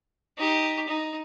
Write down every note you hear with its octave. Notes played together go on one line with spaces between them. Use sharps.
D#4 G4
D#4